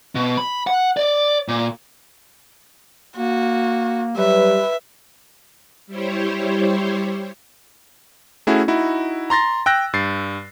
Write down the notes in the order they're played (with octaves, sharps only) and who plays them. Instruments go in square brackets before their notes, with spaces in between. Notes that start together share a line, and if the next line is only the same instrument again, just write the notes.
[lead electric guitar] B2
B5
F#5
D5
A#2
[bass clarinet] A#3 [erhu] F#4
[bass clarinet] F#3 [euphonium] G3 [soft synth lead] B4 [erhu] E5
[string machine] G3 E4 G4 C5 C#5
[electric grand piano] A3 C#4 E4 F#4 G#4
D#4 E4 F#4
A#5 C6 A6 A#6
G5 E6 F#6 A#6
G2 A6 C7